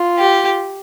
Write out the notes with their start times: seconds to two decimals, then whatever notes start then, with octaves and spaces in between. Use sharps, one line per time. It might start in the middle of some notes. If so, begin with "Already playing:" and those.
Already playing: F4
0.19 G4